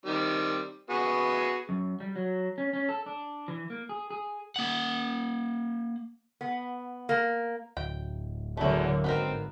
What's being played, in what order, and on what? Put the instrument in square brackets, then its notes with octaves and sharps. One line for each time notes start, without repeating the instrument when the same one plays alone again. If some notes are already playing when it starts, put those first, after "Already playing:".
[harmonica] D#3 G3 C4
B3 F#4 G#4
[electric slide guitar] F#2
G3
F#3
C#4
C#4
A4
D4
E3
A#3
G#4
G#4
[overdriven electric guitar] A#3 F#5
[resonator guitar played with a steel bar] B3
A#3
[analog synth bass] D1 [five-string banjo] G5
[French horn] E2 [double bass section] D3 F#3 A#3 [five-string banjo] A3 E4
[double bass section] G#1 [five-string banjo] B3 D#4 A#4 [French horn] C4